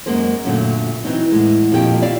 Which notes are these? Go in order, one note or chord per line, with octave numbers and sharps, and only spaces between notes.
F#2 G#3 A#3 G#4 C5
F#2 A#2 D3 F#3 G#3 A3
E3 F#3 C4 D#4
E2 A2 G#3
F2 A#2 D#3 F3 G4 G5
E4 D5 F5